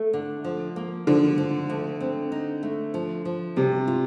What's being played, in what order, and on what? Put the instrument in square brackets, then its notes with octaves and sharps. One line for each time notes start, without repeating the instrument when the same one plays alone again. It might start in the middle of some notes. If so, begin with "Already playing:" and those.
Already playing: [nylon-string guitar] A3
D3
F3
A#3
[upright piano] D3 [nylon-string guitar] F3
[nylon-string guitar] F3
D2
C4
D#4
A3
F3
F3
[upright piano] C3 [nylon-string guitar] G3
[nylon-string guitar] F4